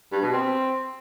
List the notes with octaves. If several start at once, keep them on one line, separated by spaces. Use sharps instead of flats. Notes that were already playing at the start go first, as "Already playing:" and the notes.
G2
B2
C4